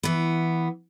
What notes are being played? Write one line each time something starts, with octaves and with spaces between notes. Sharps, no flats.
E3 B3